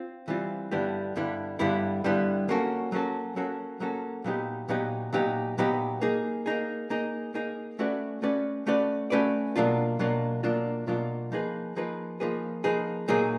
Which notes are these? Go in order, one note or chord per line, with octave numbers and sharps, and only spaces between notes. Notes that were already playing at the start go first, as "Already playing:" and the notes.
Already playing: C4 F4
E3 G3 C4 F4
G2 D3 G3 B3 E4
G2 D3 G3 B3 E4
G2 D3 G3 B3 E4
G2 D3 G3 B3 E4
F#3 A#3 C#4 F#4 A4
F#3 A#3 C#4 F#4 A4
F#3 A#3 C#4 F#4 A4
F#3 A#3 C#4 F#4 A4
A#2 F#3 B3 D#4 G4
A#2 F#3 B3 D#4 G4
A#2 F#3 B3 D#4 G4
A#2 F#3 B3 D#4 G4
A#3 D#4 G#4
A#3 D#4 G#4
A#3 D#4 G#4
A#3 D#4 G#4
A3 C#4 F#4 B4 D5
A3 C#4 F#4 B4 D5
A3 C#4 F#4 B4 D5
A3 C#4 F#4 B4 D5
B2 F#3 A#3 D4 F4
B2 F#3 A#3 D4 F4
B2 F#3 A#3 D4 F4
B2 F#3 A#3 D4 F4
F3 A#3 D#4 G#4 B4
F3 A#3 D#4 G#4 B4
F3 A#3 D#4 G#4 B4
F3 A#3 D#4 G#4 B4
A#2 F#3 A#3 D#4 G#4